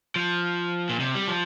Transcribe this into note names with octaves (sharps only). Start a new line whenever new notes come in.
F3
A#2
C3
G3
F3